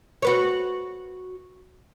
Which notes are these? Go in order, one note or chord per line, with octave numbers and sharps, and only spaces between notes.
F#4 B4 C#5